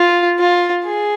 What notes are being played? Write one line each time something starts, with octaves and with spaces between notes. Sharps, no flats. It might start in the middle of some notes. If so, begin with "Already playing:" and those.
Already playing: F4
F4
G#4